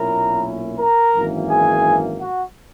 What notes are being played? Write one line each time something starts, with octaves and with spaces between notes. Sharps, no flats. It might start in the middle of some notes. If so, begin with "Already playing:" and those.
Already playing: B1 A#2 A#3 C#4 E4 A#4 A#5
A#4 A#5
G#1 F#2 E3 A#3
G#4 G#5
F#4 F#5